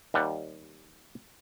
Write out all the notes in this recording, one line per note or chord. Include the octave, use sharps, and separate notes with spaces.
D#2 G3 F#5